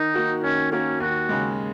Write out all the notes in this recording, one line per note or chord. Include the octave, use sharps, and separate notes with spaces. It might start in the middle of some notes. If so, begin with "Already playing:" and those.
Already playing: D#3 D#4
A#3 F#4 A#4
D#3 C#4
A#3 C#4 F#4 A#4
D#2 F#4
C#3 G#3